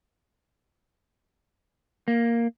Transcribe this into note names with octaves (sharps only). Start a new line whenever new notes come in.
A#3